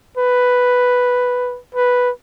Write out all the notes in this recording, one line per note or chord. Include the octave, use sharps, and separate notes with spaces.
B4
B4